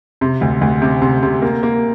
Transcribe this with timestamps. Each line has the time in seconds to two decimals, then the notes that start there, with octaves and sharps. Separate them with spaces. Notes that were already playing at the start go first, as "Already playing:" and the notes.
0.21 C3
0.41 D2
0.61 D2
0.82 C3
1.02 C3
1.23 C3
1.42 A#3
1.63 A#3